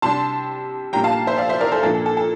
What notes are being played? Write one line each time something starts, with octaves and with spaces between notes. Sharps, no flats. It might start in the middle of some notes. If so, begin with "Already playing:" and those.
C3 G3 D4 A5 C6
A#2 G3 D4 G5 A#5
F5 A5
C5 E5
D5 F5
C5 E5
A#4 D5
A4 C5
A#2 F3 A#3 D4 A4
A4
A4
A4